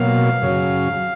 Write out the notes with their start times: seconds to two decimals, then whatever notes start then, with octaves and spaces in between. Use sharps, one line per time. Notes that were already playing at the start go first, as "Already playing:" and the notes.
Already playing: B2 F#3 A#3 F5
0.42 F#2 C#3 F#3